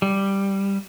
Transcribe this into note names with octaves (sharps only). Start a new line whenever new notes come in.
G3